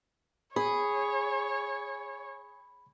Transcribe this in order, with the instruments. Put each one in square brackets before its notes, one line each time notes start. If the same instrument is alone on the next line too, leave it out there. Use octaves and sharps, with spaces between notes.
[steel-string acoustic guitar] G#4 [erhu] C#5 [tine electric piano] B5